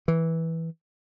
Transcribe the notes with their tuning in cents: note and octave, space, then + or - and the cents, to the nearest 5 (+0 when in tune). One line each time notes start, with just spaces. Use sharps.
E3 -10